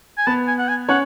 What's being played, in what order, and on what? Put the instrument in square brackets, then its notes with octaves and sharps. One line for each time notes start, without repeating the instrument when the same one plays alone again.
[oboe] G#5
[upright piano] B3 B4 [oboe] A5
[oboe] G#5
F#5
G#5
[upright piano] C#4 C#5 [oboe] F#5